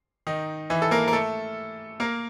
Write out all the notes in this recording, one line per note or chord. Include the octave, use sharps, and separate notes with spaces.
D#3 D#4
E3 E4
A4
A#3 A#4
A#4
A3 A4
A#3 A#4